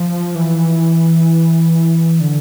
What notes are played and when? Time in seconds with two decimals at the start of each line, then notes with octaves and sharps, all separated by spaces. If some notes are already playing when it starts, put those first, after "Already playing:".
Already playing: F3
0.35 E3
2.20 D3